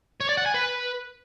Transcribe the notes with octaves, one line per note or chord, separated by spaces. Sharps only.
C#5
D5
F#5
G#5
B4